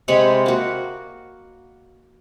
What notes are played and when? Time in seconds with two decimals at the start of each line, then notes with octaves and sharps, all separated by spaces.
0.08 C3 G#3 C#5 B5
0.46 A#3 F#4